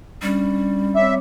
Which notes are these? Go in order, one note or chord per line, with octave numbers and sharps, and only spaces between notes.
G3 C#4 D4
C4 C#5 E5 D6